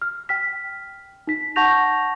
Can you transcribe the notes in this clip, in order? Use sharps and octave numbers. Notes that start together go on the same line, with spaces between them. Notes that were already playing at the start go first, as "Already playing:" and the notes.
F6
G5 F6 B6
D#4 B6
F#5 A5 C#6 G6 A#6 F7